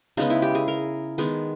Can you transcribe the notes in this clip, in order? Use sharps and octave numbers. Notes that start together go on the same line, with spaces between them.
C#3 G#3 B3 D#4
E4
G4
G#4
A#4
D#3 G#3 B3